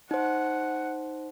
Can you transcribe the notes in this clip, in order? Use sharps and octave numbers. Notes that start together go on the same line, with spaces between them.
D#4 C5 F#5